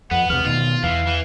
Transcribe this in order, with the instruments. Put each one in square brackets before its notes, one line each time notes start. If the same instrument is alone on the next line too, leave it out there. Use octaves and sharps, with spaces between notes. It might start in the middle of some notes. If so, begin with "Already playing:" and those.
[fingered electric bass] F2 [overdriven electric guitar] B3 [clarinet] F#5
[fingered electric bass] E2 C3 [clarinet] F6
[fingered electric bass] B2 D#3 [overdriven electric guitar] F4
[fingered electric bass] E2 [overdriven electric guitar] E3 [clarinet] F5
[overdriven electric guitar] E3